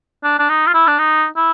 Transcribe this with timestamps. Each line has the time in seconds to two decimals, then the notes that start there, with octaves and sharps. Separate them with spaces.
0.24 D4
0.39 D4
0.49 D#4
0.67 F4
0.74 E4
0.87 D4
0.99 D#4
1.36 E4